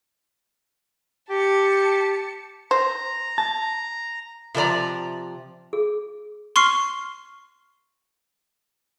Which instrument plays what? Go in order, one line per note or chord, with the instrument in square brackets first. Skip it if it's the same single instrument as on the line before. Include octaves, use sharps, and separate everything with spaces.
[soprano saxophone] G4 [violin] A5 C#7
[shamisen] C5 [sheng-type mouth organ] A#5
[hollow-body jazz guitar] A5
[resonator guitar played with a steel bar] C3 F3 A#4 D5 A#5
[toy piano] G#4
[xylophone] C6 C#6 F6 C7